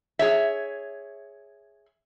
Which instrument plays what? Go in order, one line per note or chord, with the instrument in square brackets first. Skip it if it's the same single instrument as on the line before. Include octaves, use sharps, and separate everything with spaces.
[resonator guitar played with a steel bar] G#4 C#5 E5